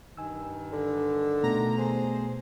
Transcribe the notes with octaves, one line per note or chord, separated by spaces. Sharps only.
G2 D#3 G#5 E6
D3
B2 D#3 A3 B3 A#5
G#4 C5